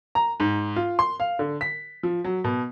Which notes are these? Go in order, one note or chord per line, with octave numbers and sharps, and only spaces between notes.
A#5
G#2
F4
C6
F5
D3
B6
F3
F#3
B2